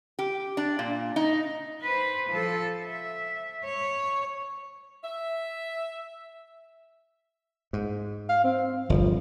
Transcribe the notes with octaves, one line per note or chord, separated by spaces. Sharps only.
G4
D4
A#2
D#4
B4 C5
F3 A4
E5
C#5
E5
G#2
F5
C4
G1 E2 G2 F3